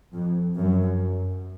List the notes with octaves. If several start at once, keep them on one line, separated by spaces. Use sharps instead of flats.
F2
F#2